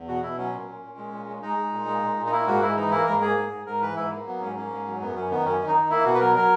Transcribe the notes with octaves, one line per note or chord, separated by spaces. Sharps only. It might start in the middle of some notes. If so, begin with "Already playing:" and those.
Already playing: E2
B2 F#4
B2 E4
F#3 C#4
A#2
A#2
A#2
G#3
A#2
G#3
G#3 D#4
G#3
A#2
G#3
A#2
A#2
D#4
A#3 E4
G#2 F#4
G#2 E4
E3 D#4
A#3 E4
G#2 A#4
A#3 G#4
G#2
G#2
G#2 A#4
E3 B4
G#2 E4
A#3
F#3 B3
G#2 C#4
A#3 C#4
G#2
F#3
F#2 B3
F#2 C#4
D#3 B3
F#2 C#4
D#3
D#4
D#3
A#3 E4
B2 F#4
B4
F#3 A#4
F#3 A#4